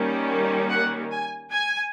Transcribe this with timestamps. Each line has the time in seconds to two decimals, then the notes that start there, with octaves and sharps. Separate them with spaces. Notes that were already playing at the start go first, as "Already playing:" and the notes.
Already playing: D#3 G3 A#3 C#4
0.69 F#5
1.11 G#5
1.52 G#5